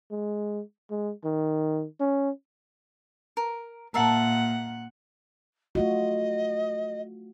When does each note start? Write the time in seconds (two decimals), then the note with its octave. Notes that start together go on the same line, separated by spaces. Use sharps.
0.11 G#3
0.91 G#3
1.24 D#3
2.00 C#4
3.37 A#4
3.94 A#2 A#4 E5 F#5 A5
5.75 A3 F4 F#4 D#5